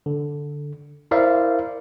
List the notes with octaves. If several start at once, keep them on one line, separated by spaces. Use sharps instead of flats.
D3
E4 A#4 C5 D5 E5 F5